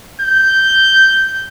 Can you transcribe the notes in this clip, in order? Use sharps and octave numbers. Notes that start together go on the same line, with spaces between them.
G6